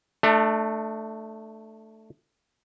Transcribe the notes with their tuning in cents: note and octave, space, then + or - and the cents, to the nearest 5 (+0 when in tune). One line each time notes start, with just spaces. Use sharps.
A3 +0 D4 +30